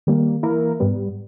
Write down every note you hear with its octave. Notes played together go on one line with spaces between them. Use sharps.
D#3 G3 A#3
E3 A#3 E4 A#4
G#2 G3 B3